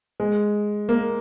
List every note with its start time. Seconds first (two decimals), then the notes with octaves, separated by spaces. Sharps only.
0.20 G#3
0.89 A#3